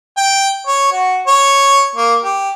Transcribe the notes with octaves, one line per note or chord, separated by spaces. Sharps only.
G5
C#5
F#4
C#5
A#3
G4